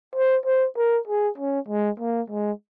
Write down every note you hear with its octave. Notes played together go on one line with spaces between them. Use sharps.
C5
C5
A#4
G#4
C#4
G#3
A#3
G#3